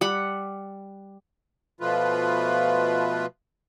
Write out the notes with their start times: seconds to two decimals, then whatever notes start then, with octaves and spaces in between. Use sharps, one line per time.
0.01 G3 F#5 B5
1.81 B2 F3 A3 F4 B4